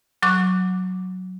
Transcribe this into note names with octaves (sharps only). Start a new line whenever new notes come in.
F#3 C#6 D6 F#6